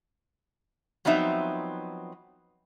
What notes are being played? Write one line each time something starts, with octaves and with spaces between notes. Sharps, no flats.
F3 F#3 B3 C4 D#4 E5